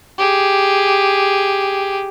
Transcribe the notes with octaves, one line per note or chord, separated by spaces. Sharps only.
G4 G#4